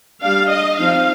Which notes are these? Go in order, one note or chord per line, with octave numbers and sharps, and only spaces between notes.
G3 D4 F5
D#5
F3 C4 D#4 F5